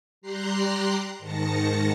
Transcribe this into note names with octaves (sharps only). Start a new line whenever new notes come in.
G3 G4 A#5 C6 F#6 C7
G#2 D#3 A5 A#6 C#7